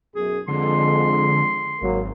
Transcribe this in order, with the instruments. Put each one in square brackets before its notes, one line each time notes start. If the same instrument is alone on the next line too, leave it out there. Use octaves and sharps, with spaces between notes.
[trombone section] B1 F#2 [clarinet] G#4
[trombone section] F2 G#3 [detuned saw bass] D3 [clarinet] C6
[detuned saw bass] G#1 [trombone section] F#3 A#3